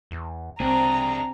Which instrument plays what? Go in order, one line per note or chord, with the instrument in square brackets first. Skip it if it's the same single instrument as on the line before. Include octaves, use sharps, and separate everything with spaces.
[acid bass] E2
[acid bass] C2 [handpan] C4 [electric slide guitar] D4 G#4 [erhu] A#5